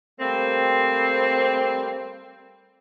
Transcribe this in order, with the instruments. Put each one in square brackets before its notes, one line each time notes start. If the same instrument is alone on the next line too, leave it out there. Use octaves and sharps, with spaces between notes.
[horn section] G3 A3 A#3 C4